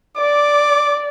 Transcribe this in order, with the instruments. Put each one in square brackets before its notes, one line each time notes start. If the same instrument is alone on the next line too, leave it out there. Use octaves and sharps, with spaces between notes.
[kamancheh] D5 [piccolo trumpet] D6